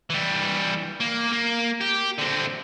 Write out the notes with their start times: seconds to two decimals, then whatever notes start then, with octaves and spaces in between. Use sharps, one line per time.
0.10 E3 G3
1.00 A#3
1.32 A#3
1.81 G4
2.18 D3 C4